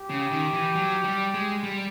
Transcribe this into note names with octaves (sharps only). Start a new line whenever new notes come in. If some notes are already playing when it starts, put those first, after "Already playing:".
Already playing: G4
C#3
D#3
E3
F#3
G3
G#3
G3